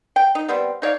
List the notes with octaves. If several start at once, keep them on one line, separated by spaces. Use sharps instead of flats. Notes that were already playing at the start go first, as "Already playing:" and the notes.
G5
D#4
G3 B3 C4
D#4 C#5 D5 F5